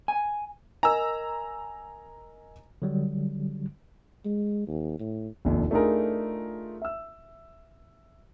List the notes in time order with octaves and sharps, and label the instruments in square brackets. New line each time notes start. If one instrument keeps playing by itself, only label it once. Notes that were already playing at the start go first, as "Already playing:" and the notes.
[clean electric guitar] G#5
[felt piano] A#4 D#5 G#5 [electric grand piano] A#5 E6
[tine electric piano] D3 F#3 G3
[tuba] G#3
D#2
A2
[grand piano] F1 A#1 D#2
A3 D4 D#4 F4 G#4 A#4
E5 E6